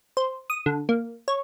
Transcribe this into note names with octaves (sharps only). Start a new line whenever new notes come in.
C5
D#6
D3
A#3
C#5